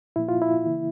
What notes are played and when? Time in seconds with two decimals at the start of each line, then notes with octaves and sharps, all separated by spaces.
0.16 A#2 F3 A#3 E4
0.29 F4
0.42 E4
0.66 C#3 E3 A#3